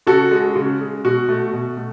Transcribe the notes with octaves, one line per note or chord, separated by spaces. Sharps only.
C#3 F#4 A4
G#3
C#3
G#3
B2 F#4
A3
B2
A3